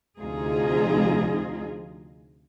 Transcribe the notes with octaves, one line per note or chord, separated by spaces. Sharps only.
D2 C3 F3 D#4 F4 G#4